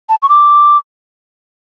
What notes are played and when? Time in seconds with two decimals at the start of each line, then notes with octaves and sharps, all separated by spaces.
0.09 A5
0.22 C#6
0.29 D6